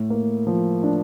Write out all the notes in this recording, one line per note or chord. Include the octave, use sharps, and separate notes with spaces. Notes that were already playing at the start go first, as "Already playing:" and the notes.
Already playing: A2
A#3
F3
D4